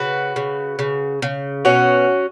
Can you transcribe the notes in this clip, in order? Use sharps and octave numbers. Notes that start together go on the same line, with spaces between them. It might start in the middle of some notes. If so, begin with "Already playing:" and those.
Already playing: C#3 F#4 B4
C#3
C#3
C#3
B2 C#4 F#4